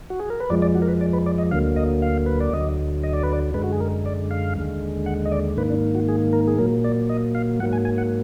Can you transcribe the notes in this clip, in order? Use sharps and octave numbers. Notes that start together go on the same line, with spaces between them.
F#4
G#4
A#4
B4
F2 F3 G#3 D5
D5
F#4
A#4
B4
D5
B4
D5
D#5
D2 D3 F#3 A#3 F5
D#5
F5
B4
D5
D2 D3 F#3 D#5
D#5
D5
B4
D5
F#2 D3 G#3 B4
F#4
G#4
A#4
D5
F5
D#2 D3 G#3
F#5
D#5
D5
G#2 D#3 A#3 B4
D4
F#4
G#4
A#4
G#4
A#2 F#3 A#3 A#4
D5
D#5
F5
G#2 F#3 A#3 F#5
G#5
G#5
F#5